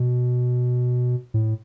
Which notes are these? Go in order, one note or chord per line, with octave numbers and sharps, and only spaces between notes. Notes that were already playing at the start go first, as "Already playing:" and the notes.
Already playing: B2
A2